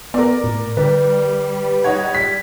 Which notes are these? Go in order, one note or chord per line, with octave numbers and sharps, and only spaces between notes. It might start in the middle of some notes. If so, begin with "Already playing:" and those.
B3 A#4 D5
A2
D3 G3 B4
D#4 C#5 F#5 G#6
B6